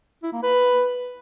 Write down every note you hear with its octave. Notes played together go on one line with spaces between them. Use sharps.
E4
A#3
B4